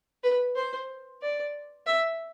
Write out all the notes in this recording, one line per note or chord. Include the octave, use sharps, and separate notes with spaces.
B4
C5
D5
E5